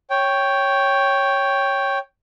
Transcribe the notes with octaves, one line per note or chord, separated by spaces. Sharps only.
C#5 G5